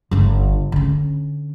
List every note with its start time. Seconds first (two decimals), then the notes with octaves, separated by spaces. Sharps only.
0.11 G1 D3
0.72 D3 C#4